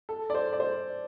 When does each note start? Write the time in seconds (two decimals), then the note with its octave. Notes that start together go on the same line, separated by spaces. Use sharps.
0.09 A4
0.30 D5
0.35 C5
0.53 D5
0.60 C5